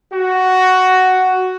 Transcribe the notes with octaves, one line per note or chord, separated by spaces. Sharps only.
F#4